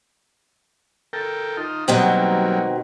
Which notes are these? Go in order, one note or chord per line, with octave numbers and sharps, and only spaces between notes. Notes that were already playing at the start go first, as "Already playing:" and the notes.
A4 A#4 G5
D#4 F4
B2 D#3 F#3 G3 A#3 C4